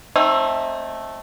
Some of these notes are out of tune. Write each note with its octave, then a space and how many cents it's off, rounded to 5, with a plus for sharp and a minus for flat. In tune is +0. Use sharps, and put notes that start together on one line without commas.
A3 +0 C4 +30 D#4 +0